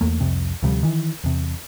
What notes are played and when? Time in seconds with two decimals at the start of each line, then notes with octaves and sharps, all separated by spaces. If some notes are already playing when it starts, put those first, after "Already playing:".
0.01 E2 A3 A#3
0.20 C2 F2 C3
0.63 D2 C3 F3 G3
0.83 D#3 E3
1.24 E2 C3